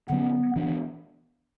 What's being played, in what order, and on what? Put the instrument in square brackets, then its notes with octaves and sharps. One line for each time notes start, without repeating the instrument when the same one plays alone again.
[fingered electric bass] D3 F#3 C#4 [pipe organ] B3
[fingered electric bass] E3 B3 D4